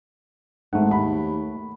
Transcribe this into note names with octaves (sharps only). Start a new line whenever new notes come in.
G#1 G#2 A3 F#5
D#2 B5